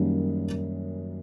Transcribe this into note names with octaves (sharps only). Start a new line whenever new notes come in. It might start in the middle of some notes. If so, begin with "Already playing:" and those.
Already playing: F#2 D#3 G3 A#3 C#4